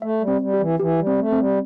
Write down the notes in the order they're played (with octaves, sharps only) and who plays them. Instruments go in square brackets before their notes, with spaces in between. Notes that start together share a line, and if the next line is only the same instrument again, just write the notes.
[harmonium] A3 [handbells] E5
[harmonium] G3
[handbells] C4
[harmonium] G3
[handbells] G4
[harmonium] E3
[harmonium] E3 [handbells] G4
[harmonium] G3
[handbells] C4
[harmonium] A3
[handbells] C4
[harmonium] G3